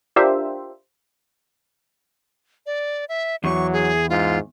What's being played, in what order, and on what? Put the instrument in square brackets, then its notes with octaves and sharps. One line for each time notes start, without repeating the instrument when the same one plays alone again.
[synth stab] D4 F4 G4 A#4 C5 E5
[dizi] D5
E5
[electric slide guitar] E2 [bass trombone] F#3 [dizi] C#6
[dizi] G#4
[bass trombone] G#2 [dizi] F4